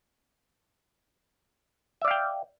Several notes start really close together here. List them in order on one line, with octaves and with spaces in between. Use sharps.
E5 D5 F5 G5